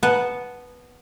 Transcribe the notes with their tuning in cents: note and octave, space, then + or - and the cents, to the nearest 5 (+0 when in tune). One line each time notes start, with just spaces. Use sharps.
B3 -5 F#5 +0 A5 -20